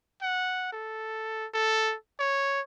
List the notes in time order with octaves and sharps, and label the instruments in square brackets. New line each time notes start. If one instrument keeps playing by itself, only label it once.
[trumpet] F#5
A4
A4
C#5